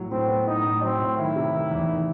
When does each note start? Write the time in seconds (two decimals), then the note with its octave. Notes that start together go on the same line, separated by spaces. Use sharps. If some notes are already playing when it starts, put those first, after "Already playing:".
Already playing: A2 F#3
0.11 A2 C4
0.28 B3
0.47 A2 D#4
0.64 A2
0.82 F#3 C4
0.99 A2
1.18 D#3 E4
1.36 C3
1.53 D#3
1.71 E2
1.88 D#3